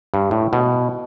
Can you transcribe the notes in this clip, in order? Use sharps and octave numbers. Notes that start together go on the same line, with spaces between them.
G2
A2
B2